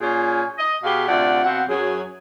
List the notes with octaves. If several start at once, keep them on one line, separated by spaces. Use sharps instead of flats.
A#2 C#4 F4 G#4
D#5
B2 G4 G#4 F5
D2 C3 F4 D5 F#5
B2 C4 F5 F#5
F#2 F#3 G#4